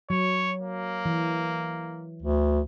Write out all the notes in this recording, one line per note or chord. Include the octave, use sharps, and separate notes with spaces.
F#3 C#5
A#3
E3
D2